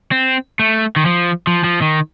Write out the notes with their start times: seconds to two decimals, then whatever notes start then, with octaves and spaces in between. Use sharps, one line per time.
0.12 C4
0.59 A3
0.96 D#3
1.05 F3
1.47 F3
1.64 F3
1.82 D#3